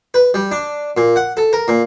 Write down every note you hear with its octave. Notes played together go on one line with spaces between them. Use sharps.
B4
G3
D4
A#2
F#5
A4
A#4
A#2